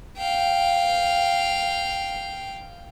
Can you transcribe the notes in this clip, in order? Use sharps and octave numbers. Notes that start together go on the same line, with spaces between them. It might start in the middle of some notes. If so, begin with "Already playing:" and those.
F5 G5